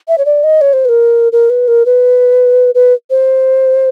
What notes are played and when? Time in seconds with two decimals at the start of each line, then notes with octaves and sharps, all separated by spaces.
0.08 E5
0.18 C#5
0.25 D5
0.44 D#5
0.61 C#5
0.73 C5
0.85 B4
0.89 A#4
1.32 A#4
1.50 B4
1.68 A#4
1.86 B4
2.75 B4
3.10 C5